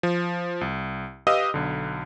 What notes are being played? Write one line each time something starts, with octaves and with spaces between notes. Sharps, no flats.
F3
C2
G4 B4 D#5 F5 D#6 E6
B1 D3